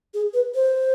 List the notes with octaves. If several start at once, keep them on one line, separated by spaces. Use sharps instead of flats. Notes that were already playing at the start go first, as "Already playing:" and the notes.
G#4
B4
C5